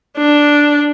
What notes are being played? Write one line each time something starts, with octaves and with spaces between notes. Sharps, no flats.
D4